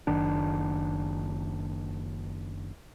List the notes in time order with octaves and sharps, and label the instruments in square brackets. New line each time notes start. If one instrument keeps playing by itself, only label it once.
[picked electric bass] F#1 D#3 D4